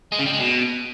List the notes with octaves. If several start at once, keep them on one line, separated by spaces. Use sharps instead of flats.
G#3
C#3
G3
G#3
B2